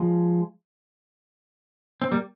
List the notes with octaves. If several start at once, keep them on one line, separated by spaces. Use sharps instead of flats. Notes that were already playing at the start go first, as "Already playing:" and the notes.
Already playing: F3 G#3
C4
G3 A#3